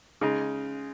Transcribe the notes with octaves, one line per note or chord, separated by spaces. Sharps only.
C#3 G#3 D#4